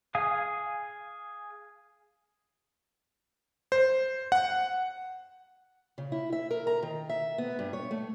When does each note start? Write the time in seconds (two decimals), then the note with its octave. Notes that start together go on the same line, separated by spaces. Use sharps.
0.15 G#4 F5 G#5 D#6
3.72 C5
4.32 F#5
5.98 C#3
6.12 E4
6.32 E5
6.51 A#4
6.67 A#5
6.82 D#3
7.09 E5
7.38 B3
7.59 G2
7.73 C#5
7.91 A3